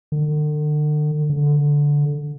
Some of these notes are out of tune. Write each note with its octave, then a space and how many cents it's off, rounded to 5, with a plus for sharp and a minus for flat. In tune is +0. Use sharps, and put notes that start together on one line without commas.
D3 +40
D3 -10